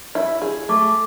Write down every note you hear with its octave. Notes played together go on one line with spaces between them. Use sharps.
E4
G#4
A3 D6